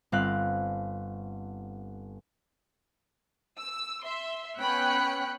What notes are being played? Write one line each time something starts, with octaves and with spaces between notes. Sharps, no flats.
G1 C4 F5 F#6
E6
E5 C6
B3 C#4 G5 B5 F#6 C#7